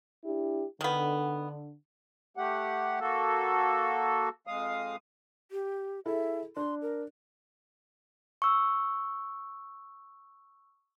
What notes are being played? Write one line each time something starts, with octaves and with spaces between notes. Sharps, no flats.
D4 E4 G4
D3 D#3 B3
A3 G4 F#5
A#3 F#4 A4
F2 G#3 F5 D#6
G4
E4 G#4 A4 E5
D4 C6
A#4
C#6 E6